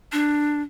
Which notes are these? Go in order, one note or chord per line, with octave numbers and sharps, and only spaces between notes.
D4